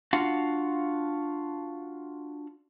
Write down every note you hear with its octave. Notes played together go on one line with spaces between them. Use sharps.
D4 F4 F#4 F5 F#5